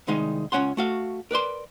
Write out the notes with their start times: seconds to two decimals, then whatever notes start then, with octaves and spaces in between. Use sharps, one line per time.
0.07 C2 D#3 G#3 D#4 D#5 F5
0.52 C#2 G#2 C#4 C#5 F#5 C6
0.77 A3 F#4 F5
1.31 A#4 B4 D5 C6